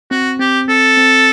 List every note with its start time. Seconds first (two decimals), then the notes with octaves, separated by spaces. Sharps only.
0.11 C4 F#4
0.40 C4 G4
0.68 C4 A4
0.97 C4